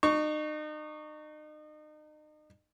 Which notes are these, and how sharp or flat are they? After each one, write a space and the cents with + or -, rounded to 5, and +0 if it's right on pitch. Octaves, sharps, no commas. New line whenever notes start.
D#4 -35 C#6 +10